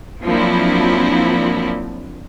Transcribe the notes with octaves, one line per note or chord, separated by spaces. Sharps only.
F3 F#3 A#3 C4 D4 E4